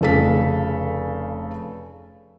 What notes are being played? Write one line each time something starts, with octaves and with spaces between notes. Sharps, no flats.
F1 C#3 A4 F5 B6